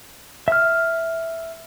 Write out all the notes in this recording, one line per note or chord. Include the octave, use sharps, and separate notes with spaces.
E5 F6